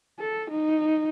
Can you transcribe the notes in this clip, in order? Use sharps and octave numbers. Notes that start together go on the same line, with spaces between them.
A4
D#4